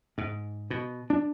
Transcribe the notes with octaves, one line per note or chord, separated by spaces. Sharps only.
G#2
B2
D4